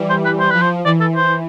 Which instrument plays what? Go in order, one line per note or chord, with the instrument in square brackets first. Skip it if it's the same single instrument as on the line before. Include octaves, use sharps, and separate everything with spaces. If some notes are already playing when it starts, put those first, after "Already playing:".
Already playing: [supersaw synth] E3 G3
[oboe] C5
B4
C5
[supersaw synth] F3 [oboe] B4
[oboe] C5
[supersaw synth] E3 [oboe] D5
[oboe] A4
C5